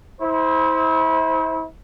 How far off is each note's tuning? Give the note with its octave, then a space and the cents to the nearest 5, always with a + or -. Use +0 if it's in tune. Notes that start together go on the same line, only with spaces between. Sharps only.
E4 -35 C5 +0